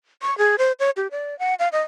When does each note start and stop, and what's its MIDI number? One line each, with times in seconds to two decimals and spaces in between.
0.22 0.37 85
0.38 0.56 68
0.58 0.72 72
0.80 0.90 73
0.97 1.07 67
1.11 1.38 74
1.39 1.54 78
1.59 1.68 77
1.72 1.81 75